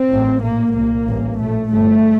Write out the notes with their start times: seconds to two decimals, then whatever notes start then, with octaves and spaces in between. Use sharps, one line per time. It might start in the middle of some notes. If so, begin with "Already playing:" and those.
Already playing: C4
0.09 A1 A2
0.41 A#1 A2 A#3
0.74 C2 A#2 A#3
1.06 A1 G2
1.39 A#1 A2 A3
1.71 G1 G2 A3